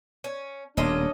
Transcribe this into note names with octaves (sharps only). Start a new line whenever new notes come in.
C#4
D#1 B2 A3 A#3 C#4 D4 D#5 C6